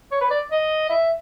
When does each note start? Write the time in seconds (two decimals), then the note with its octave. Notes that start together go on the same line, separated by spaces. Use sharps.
0.12 C#5
0.21 B4
0.31 D5
0.51 D#5
0.90 E5